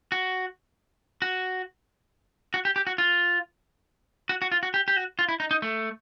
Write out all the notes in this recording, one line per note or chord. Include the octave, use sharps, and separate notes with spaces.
F#4
F#4
F#4
G4
G4
F#4
F4
F#4
F#4
F4
F#4
G4
G4
F#4
F4
E4
D#4
D#4
A3